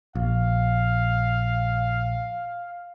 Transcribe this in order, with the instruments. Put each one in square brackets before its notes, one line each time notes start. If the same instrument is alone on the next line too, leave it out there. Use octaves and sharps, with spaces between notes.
[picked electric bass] A#1 [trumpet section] F5